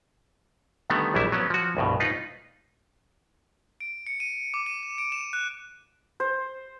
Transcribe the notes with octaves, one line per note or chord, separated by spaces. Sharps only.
D3 D#3 G3 A3 B3
A#1 F#3 G3 E4 E5
F#3 B3 C#4
F3 F#4
C2 G2 B2
D#4 F4 B4
D7
C#7
D#7
D6
D#7
E7
D7
E7
F#6
C5